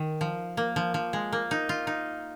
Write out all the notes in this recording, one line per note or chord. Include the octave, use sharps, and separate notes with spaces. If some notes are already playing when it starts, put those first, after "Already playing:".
Already playing: D#3
F3
A#3
F3
F3
G#3
A#3
D#4
F4
D#4